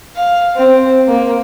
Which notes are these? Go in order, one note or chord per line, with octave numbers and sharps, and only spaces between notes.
F5
C4
A#3